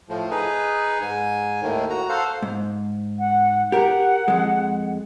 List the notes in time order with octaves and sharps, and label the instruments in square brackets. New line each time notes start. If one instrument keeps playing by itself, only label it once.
[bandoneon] A2 F3
D#4 G#4 B4
G#2 G#5
D#2 A2 D#3
F#4 A#5
A4 C5 F5 F#5
[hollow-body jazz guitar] G#2
[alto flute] F#5
[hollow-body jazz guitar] G4 A#4 [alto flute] F#5
[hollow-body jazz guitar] F2 G#3